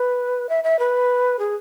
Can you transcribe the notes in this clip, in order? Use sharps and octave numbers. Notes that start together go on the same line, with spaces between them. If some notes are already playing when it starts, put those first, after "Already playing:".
Already playing: B4
E5
E5
B4
G#4